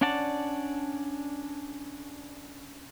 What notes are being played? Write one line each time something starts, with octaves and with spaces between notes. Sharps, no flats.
C#4 D4 D5 F#5 A5